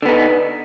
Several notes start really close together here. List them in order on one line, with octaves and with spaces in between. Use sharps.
D3 B3 D#4